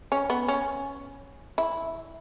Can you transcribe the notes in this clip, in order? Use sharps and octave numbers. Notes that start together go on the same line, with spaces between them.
C#4
B3
C#4
E4